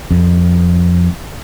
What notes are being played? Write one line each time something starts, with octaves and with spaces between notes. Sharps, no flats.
F2